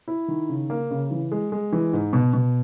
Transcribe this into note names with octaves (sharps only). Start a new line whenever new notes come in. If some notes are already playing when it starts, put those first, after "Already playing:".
E4
D#3
C#3
A#3
C#3
E3
G#3
G#3
E3
G#2
B2
B2